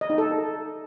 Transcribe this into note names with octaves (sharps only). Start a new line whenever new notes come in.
D#5
D#4
A4